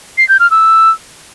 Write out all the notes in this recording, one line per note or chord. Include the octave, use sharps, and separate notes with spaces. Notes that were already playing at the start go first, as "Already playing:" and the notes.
C7
G6
F6
E6